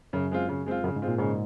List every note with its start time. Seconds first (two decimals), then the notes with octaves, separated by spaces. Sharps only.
0.13 F#2 C#3
0.31 G#3 C4 F4
0.49 C#3
0.66 G#3 C4 F4
0.83 F#2 C#3
0.96 G#2
1.02 G#3 C4 F4
1.08 A#2
1.19 G#2 C#3